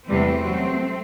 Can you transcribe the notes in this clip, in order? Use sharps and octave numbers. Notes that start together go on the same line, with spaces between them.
E2 C3 E3 G3 A3 C4
F#2 F#3